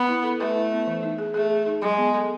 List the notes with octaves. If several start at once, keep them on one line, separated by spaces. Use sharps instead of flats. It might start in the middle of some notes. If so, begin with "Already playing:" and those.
Already playing: B3
E4
A4
A3 B4
E4
B3
E3
D#4
G#4
A3 G#4
G#4
D#4
F#3 G#3
B3
A4